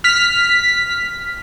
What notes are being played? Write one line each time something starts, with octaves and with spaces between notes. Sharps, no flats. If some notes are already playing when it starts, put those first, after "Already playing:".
F6 B6